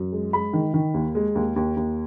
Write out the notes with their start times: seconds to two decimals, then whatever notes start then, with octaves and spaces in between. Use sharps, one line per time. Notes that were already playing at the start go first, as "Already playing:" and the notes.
Already playing: F#2
0.13 G#3
0.33 G#3 B5
0.53 D#3
0.74 D#3
0.94 D#2
1.15 G#3
1.35 D#2
1.56 D#2
1.77 D#2